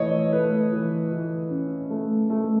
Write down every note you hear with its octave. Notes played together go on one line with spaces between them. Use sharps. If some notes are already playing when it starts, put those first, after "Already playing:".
Already playing: E3 A3 C#5 D#5
A3 B4
E3
E3
C#4
A3
A3